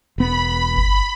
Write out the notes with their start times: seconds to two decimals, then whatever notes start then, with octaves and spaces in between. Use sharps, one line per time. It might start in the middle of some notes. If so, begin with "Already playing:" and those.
0.18 E1 B3 B5
0.77 G1